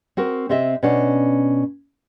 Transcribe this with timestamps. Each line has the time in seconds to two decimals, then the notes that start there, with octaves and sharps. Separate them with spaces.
0.17 C4 F#4 A#4
0.49 C3 C4 D#5 E5
0.83 B2 C#4 D4